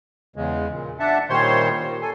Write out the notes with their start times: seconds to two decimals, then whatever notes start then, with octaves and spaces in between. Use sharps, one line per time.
0.36 E2 C#3 G#3
0.70 A#2
0.99 D4 E5 F#5 A5
1.30 A#2 D#3 G3 C5 C#5 C6
1.87 D#3
2.02 A4 G#5